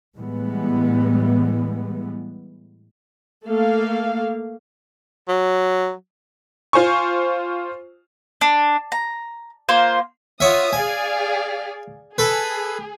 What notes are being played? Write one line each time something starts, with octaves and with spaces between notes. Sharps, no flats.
A2 E3 G3 G#3 B3
A3 A#3 A4 F5
F#3
F4 C5 G#5 C#6
D4
A#5
A#3 F4 C5 C6
F4 C#5 E5 F#5 D#6
G#4 D5 F5 G#5
G#4 A4 B4